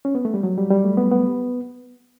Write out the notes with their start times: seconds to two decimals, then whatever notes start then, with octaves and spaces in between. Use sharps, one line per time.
0.05 C#4
0.15 B3
0.25 A3
0.34 G3
0.43 F#3
0.58 G3
0.70 G3
0.84 A3
0.97 B3
1.11 B3